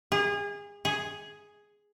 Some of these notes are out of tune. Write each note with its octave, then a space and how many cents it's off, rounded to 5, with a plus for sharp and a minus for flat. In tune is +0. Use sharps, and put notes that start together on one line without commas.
G#4 -30
G#4 +0